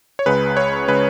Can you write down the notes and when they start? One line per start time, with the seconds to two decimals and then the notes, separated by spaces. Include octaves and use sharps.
0.19 C#5
0.26 C#2 C#3 G#3 B4
0.57 C#5
0.88 C#3 G#3 B4